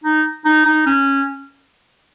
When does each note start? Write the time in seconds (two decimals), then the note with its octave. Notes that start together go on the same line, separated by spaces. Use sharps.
0.04 D#4
0.45 D#4
0.65 D#4
0.86 C#4